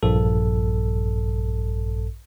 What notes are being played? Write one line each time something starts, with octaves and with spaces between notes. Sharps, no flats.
A#1 G2 A4